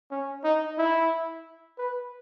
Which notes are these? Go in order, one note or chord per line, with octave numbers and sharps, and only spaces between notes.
C#4
D#4
E4
B4